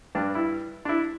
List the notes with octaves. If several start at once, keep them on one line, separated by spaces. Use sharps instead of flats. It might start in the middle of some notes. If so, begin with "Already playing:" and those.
G2 G3 D4
E4
D4
E4